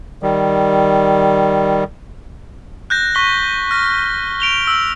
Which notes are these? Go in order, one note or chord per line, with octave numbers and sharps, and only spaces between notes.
D#3 G3
F#6 G6 A#6
C#6 B6 G7
F6 A#6
D7 F7 G7
E6